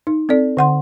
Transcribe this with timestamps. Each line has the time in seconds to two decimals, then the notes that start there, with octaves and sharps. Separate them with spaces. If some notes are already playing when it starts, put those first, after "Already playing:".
0.07 D#4
0.29 C4 A4 D5
0.57 D3 F#5 C6